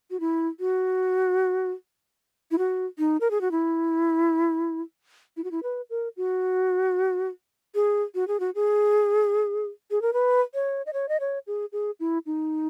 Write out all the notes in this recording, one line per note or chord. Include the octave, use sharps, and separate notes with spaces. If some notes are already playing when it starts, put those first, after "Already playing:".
F#4
E4
F#4
E4
F#4
D#4
A#4
G#4
F#4
E4
E4
F#4
E4
B4
A#4
F#4
G#4
F#4
G#4
F#4
G#4
G#4
A#4
B4
C#5
D#5
C#5
D#5
C#5
G#4
G#4
E4
D#4